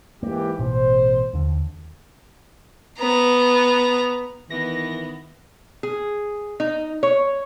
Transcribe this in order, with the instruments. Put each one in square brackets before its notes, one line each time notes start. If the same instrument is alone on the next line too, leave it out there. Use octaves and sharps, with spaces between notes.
[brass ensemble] G#2 E3 G4 [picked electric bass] A#3
[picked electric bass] A1 B2 [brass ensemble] C5
[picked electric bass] D#2 D3
[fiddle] B3 A#5
[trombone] D#3 [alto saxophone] E3 [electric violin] B3 [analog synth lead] A#6
[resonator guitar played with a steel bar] G#4
D#4
C#5